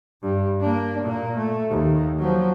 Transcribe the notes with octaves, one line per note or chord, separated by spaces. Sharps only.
G2
A#3 D4
A#2 A#3
A3
D#2
F3 F#3